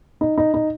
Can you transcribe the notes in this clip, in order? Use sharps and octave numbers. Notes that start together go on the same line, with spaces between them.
D#4
D#4
D#4